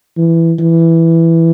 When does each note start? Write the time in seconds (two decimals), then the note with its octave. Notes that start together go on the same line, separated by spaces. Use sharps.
0.17 E3
0.59 E3